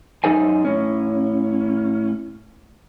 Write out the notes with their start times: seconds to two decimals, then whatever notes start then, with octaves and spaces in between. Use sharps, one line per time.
0.24 F#2 D#4 A4 C5 G#5
0.65 A2 C#4